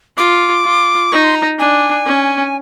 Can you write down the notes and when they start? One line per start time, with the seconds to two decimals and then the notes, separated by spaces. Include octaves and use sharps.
0.17 F4 D6
0.64 F4
1.12 D#4 C#6
1.24 C6
1.35 A#5
1.59 D4 G#5
2.07 C#4